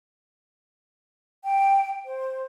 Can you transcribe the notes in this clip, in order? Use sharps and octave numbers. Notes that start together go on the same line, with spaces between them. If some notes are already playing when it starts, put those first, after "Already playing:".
G5
C5